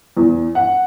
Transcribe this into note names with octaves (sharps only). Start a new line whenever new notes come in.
E2
F#5